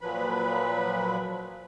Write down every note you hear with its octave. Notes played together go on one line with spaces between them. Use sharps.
A#2 F3 F#3 B4 B5